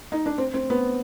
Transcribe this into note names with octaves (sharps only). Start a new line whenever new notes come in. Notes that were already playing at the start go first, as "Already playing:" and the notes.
D#4
D4
C4
C4
B3